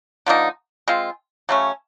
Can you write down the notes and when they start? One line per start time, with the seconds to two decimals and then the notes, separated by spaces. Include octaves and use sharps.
0.26 D3 F3 A#3 D#4
0.88 G#3 C4 F4
1.49 C#3 F#3 A3 C#4